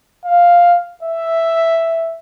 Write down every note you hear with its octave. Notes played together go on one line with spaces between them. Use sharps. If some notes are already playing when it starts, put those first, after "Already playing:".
F5
E5